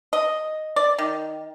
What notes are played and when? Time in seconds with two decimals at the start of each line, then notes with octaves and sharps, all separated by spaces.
0.13 D#5
0.76 D5
0.98 D#3